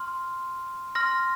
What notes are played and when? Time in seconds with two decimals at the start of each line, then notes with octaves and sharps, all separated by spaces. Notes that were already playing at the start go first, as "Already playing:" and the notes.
Already playing: C6 F6
0.95 C6 F6 A#6